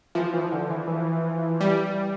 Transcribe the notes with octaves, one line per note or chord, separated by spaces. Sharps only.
E3 F3
E3
D3
E3
E3
G3